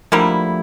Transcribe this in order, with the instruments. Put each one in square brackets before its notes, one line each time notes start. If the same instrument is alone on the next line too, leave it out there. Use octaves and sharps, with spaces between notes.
[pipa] D3 G3 A#3 E4 [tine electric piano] F3 A3